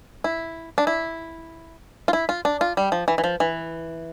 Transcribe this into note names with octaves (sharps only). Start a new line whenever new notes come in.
E4
D4
E4
F4
E4
F4
D4
F4
G3
F3
E3
E3
F3
E3